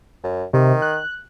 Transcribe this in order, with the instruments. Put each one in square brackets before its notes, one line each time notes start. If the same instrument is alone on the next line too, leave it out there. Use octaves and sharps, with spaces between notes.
[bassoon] F#2
[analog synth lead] C3 [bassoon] D#3
[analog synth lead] F#6